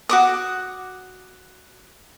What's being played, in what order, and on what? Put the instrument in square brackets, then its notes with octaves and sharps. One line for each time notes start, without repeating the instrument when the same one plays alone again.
[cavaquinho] F#4 D6 D#6